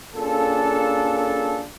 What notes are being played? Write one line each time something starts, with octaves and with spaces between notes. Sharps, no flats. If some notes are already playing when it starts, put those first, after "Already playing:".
A#3 C#4 D4 F4 G#4 A4